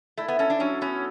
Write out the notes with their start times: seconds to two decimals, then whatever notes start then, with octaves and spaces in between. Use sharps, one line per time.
0.17 A3 E4
0.28 B3
0.39 C#4 A4
0.50 D4
0.60 F#3 C#4
0.81 B3 C#4